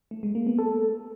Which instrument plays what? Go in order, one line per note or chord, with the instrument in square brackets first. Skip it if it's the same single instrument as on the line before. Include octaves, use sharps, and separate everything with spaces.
[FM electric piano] A3
G#3
A#3
B3
A4